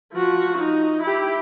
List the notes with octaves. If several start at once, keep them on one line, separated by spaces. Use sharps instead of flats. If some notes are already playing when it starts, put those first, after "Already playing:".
F3 F#4
D#4
E4 G4